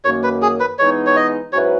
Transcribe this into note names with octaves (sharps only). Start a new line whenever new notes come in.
F#2 D#3 A#3 C#5
B4
G#4
B4
E3 G#3 B3 D#4 C#5
C#5
D#5
G#2 F#3 C#4 E4 B4 C#5